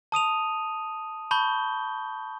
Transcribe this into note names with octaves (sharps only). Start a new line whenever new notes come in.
A5 D#6 D#7 F7
A5 B5 C#6 G6 G7